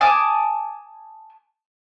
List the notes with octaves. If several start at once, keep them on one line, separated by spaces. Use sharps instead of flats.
G#5 A5 D6 D#6